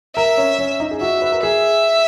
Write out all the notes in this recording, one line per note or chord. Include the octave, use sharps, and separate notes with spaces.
A#4 E5
C#4
C#4
D#4
G#4
F#4 E5
B4
A#4
G#4 E5